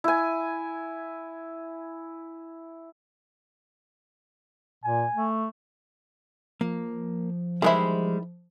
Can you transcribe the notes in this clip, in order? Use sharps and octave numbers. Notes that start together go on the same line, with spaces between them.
E4 G#5
A#2 G#5
A3
F3 A#3
D#3 E3 G3 G#3 E4 C5